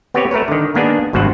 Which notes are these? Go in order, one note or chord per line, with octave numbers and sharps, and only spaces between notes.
B3 C4 G4 B4 C#5
A3 A#4 B4 C#5
D3 D#3
D#3 A#3 B3 D4 G#4
G#1 G2 B2 C5 F#5